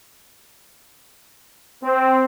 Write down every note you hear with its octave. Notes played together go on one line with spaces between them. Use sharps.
C4